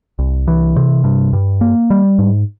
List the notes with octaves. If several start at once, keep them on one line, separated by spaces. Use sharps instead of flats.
C2
E3
C3
G2
G2
A#3
G3
G#2